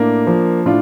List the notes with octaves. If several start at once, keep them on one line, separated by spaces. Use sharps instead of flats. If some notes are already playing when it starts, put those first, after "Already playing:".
Already playing: A2 A#3 D4
F3
A2 D4 F4